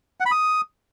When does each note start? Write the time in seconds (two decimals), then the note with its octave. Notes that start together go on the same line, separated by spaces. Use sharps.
0.20 F#5
0.26 B5
0.31 D#6